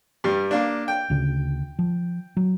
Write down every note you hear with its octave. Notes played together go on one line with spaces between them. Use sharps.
G2 G3
A#3 D4
G5
D2 C#3
F3
F#3